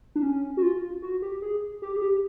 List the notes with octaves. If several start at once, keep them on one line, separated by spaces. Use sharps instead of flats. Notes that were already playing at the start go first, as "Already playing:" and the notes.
D4
C#4
F#4
F4
F#4
G4
G#4
G4
G#4
G4